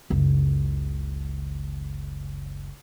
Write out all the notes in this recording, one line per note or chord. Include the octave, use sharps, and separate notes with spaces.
F#1 C#2